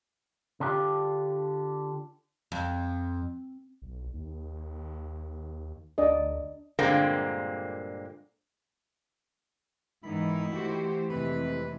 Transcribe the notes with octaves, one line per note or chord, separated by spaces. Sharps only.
D3 D4 F4 G4
F2
B1
D#2
D2 D4 D5 D#5
G2 A#2 D3 G#3 A#3 C4
G#2 D#3 E3 G#3 B3 D#4 E4
E3 A3 F#4 G4 C5
F2 C3 G#3 B4